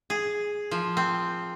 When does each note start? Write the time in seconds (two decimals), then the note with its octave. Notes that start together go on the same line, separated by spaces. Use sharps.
0.10 G#4
0.71 F3
0.97 C4